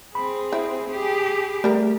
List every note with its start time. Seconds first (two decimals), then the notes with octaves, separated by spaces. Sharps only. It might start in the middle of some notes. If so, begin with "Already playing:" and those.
0.15 C4 G#4 B5
0.53 E4
0.88 G4 G#4
1.64 G3 A3 A#4 A#5